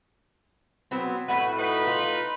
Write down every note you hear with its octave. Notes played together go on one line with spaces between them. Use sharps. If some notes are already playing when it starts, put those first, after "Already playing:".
F#3 B3 C4
A2 A3 F#4 B4
D#4 B4
F4